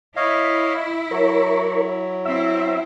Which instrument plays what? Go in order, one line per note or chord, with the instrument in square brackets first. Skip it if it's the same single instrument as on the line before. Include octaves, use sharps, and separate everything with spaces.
[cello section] E4 [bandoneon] C#5 D#5 F5
[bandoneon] F#3 [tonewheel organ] A#4 C#5
[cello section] C4 E4 [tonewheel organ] E5